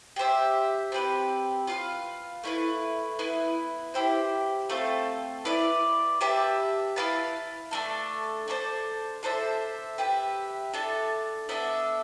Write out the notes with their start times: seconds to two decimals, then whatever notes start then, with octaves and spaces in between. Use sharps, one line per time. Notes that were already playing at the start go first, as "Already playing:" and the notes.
0.16 G4 C5 E5
0.92 C4 G4 B4
1.67 F4 B4 F5
2.43 A3 E4 B4
3.19 B3 E4 B4
3.94 E4 G4 C5
4.70 A3 C4 F4 A4
5.45 E4 B4 D5
6.21 G4 B4 E5 A5
6.96 E4 B4 F5 A5
7.71 A3 D4 A4
8.48 D4 A4 C5
9.23 D4 A4 C5 E5
9.98 G4 B4 E5
10.73 D4 A4 E5 A5
11.49 B3 D4 A4 E5